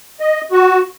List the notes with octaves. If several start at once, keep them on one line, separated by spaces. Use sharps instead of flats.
D#5
F#4